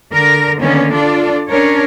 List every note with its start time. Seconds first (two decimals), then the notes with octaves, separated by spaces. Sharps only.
0.12 D3 A#4
0.59 D3 D#3 A#3 B3 C#4
0.93 D4 F4 A4 D5
1.49 C#4 D4 A#4 C#5